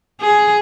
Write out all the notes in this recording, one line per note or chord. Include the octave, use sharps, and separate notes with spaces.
G#4